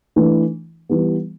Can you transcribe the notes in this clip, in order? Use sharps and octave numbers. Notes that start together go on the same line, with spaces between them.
E3 A3 D4
E3 G3 B3